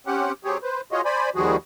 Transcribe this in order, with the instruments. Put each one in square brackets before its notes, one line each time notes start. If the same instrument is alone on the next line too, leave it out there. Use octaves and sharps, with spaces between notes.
[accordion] C4 C#4 G4 F#5
F#3 C4 G4 G#4 C#5
B4 C5
F4 F#4 G#4 C#5 D#5
C5 D5 G#5 B5
D#2 D#3 F3 G3 F#4 G#4